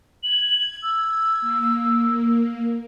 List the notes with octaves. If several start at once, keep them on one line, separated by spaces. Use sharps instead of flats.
G#6 F#7
E6
A#3